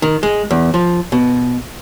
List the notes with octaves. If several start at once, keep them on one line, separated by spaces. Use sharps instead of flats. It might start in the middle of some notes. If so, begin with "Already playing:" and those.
D#3
G#3
E2
F3
B2